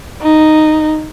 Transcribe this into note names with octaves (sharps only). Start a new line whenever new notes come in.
D#4